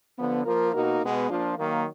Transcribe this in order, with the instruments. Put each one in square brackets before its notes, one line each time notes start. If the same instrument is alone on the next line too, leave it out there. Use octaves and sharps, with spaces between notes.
[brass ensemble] D3 F3 B3
F3 A#3 F4 A#4
B2 A#3 D#4 F#4 A#4
B2 G#3 B3
F3 A#3 D4 F4
D#3 F#3 A#3